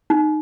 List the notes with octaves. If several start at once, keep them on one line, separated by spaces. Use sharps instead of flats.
D#4